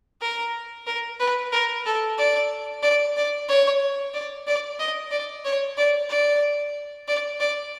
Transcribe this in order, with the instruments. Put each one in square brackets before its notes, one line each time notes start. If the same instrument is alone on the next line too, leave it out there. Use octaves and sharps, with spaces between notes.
[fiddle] A#4
A#4
B4
A#4
A4
D5
D5
D5
C#5
D5
D5
D#5
D5
C#5
D5
D5
D5
D5